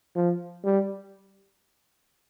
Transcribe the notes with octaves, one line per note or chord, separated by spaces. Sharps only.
F3
G3